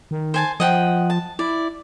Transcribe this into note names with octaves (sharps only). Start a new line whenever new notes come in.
D#3
C5 G#5 A5
F3 D#5 F#5 G5
A5
E4 D5